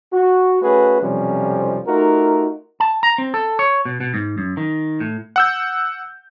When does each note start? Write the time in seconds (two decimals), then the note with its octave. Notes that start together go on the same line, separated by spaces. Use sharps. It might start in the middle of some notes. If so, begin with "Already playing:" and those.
0.13 F#4
0.62 A3 C#4 F#4 G#4 B4
1.02 B1 F2 C3 F3 G3 C#4
1.87 A3 D#4 F4 F#4 A#4
2.80 A5
3.03 A#5
3.18 C4
3.34 A4
3.59 C#5
3.85 B2
4.00 B2
4.14 G#2
4.38 F#2
4.57 D#3
5.00 A2
5.36 F#5 E6 G6